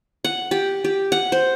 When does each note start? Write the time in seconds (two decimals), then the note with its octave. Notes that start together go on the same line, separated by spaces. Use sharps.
0.24 F#5
0.51 G4
0.84 G4
1.12 F#5
1.32 C5